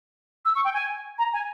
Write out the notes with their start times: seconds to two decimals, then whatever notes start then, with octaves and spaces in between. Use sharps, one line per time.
0.45 E6
0.55 C#6
0.65 G5
0.74 G#5
1.19 A#5
1.33 G#5